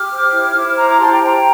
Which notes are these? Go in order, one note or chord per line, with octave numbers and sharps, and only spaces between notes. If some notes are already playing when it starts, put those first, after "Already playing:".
Already playing: G4 D6 F6
C5
E4
E4
C5 A#5 D6
A#5 D6
G4 A5 C6
G5 A#5
C5 G5 A#5